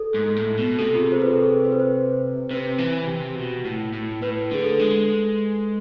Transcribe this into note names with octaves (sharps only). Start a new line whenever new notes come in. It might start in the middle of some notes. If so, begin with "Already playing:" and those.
Already playing: A4
G#2
A2
B2
C3 A4
F4
G#4
C5
B4
A4
G#4
C5
B4
C5
C3 B4
E3
C3
B2
A2
A2
A2 B4
D3 G#4
A4
G#3